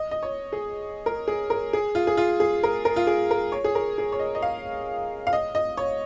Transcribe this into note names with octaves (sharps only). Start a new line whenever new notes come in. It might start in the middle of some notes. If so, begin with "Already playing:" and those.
Already playing: D#5
D#5
C#5
G#4
A#4
G#4
A#4
G#4
F4
G#4
F4
G#4
A#4
A#4
F4
G#4
A#4
C#5
G#4
A#4
G#4
C#5
D#5
D#5
F5
F5
D#5
D#5
C#5